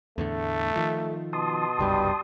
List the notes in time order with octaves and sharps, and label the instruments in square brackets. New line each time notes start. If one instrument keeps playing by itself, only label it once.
[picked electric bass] E2 A2 D3 [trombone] A3
[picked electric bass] D#3 F3
[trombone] B2 [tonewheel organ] A5 C6 D#6
[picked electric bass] F#1 C2 G2 [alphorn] G3